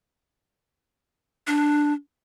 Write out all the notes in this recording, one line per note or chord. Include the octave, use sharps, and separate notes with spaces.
D4